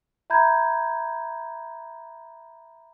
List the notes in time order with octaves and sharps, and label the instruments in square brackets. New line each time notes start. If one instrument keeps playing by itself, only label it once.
[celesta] E5 A#5 B5 G6 G#6